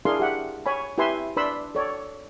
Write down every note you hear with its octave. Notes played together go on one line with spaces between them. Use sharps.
D4 E4 G#4 A#4 F5 C6
G4 E5 F#5
C#5 G#5 B5
E4 G4 B4 E5 G#5 C6
D4 B4 D5 B5 C6 E6
A4 C#5 D5